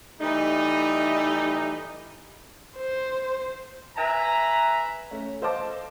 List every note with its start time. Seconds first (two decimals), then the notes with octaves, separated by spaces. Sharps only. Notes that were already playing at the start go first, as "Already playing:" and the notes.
0.20 E3 G3 A3 D#4
2.78 C5
3.96 B4 E5 G#5 A#5
5.11 A3 C#4
5.42 A4 C5 D#5 F5 A5 D6